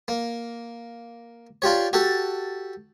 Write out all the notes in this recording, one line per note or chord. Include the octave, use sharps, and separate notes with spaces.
A#3
D4 F4 G4 C#5
F#4 G4 A4 A5